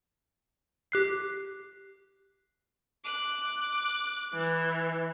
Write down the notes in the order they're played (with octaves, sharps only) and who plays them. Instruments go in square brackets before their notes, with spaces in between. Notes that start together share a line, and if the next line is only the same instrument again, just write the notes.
[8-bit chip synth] G4 F#6 C7
[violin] D6 F#6
[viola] E3